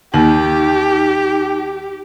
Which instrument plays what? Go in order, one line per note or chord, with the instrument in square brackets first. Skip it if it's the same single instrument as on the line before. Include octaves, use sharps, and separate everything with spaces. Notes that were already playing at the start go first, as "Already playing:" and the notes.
[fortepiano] D#2 [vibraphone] D#4 [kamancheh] G4